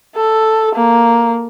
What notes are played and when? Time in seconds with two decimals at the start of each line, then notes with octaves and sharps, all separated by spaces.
0.16 A4
0.75 A#3